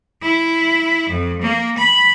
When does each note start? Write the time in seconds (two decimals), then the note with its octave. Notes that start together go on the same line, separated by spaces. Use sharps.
0.22 E4
1.10 F2
1.42 A#3
1.77 B5